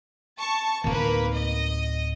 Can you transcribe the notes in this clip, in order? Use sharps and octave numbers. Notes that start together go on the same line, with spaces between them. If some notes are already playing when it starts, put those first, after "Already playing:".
A5 C#6
D1 A#3 D#4 B4
D#5